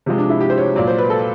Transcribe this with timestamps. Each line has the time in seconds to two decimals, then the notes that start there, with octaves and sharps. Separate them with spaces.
0.06 C3 F3 G#3
0.18 D4
0.30 E4
0.41 G4
0.50 C5
0.58 C#5
0.76 A#2 F#3 D5
0.87 C5
0.98 B4
1.10 A4